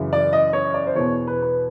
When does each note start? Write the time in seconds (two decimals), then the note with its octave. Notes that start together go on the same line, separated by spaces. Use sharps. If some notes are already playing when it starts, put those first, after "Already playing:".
Already playing: F#2 C#3 E3
0.13 D5
0.33 D#5
0.53 C#5
0.74 D5
0.87 C5
0.95 E2 B2 C#5
1.27 B4
1.42 B4